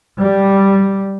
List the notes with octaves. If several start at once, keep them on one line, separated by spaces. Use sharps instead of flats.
G3